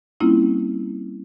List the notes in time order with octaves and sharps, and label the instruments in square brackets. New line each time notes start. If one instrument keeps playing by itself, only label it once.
[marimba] G3 A#3 C4 C#4 E4 F4